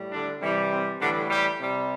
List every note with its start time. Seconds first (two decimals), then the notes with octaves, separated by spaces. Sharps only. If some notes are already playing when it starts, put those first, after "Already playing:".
Already playing: A2 G3
0.12 D3 D4
0.41 C3 E3 G3
0.72 C4
1.00 A2 D3 E3 G3 D4
1.30 G3 G4
1.60 C3 G3